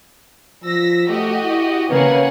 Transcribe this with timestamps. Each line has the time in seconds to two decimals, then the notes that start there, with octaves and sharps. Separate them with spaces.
0.63 F3 E6 A#6 B6
1.09 A3 F#4 G4 D#5
1.42 E4
1.90 C#3 A#3 B4 C#5 F#5 G#5